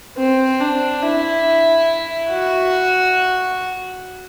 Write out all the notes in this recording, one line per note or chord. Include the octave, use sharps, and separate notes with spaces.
C4
D4
E4
F#4